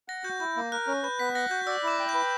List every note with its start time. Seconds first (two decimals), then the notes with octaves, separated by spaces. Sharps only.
0.08 F#5 A#6
0.24 F#4 G6
0.40 E4 G6
0.56 A#3
0.72 A#4 F#6
0.87 C#4
1.03 B4 G6
1.19 B3 B6
1.35 F#5 A#6
1.50 F#4 G6
1.67 D5 E6
1.83 E4 D6
1.99 G5
2.09 G6
2.14 B4